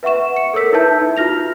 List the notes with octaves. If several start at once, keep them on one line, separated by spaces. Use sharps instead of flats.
B4 E5 F#5 C#6 E7
C#7
A4 A#4 C#5 E6 B6
D#4 E4 B4 E5 A5 G6
D#4
F4 F#4 F6 A#6 F7